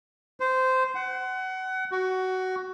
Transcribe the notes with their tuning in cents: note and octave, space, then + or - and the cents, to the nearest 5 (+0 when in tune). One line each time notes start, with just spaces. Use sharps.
C5 -15
F#5 +25
F#4 +15